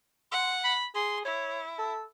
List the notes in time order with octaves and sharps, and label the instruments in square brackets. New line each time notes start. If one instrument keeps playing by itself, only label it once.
[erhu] F#5 [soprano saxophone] C6
[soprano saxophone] B5
[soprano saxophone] G#4 [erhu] C6
[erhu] E4 [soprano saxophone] C#5
[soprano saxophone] A4